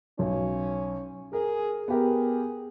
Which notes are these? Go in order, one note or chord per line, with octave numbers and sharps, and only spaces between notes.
B1 C#4
G#4 A#4
B3 G4 G#4 A#4